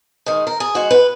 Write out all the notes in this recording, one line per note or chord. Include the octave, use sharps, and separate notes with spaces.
D#3 G#3
A#4
G#4
D#3 G#3 F#4
B4